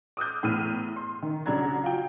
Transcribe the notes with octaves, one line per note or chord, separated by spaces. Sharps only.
D6 D#6 F6 G6
E2 A2 E3 E6 F6 D#7
C6
D#3
C2 C#3 F#3 D4 A#5 G#6
F4 F#4 G5